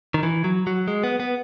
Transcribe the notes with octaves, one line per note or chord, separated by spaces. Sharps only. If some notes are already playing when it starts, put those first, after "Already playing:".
D#3
E3
F#3
F#3
G#3
B3
B3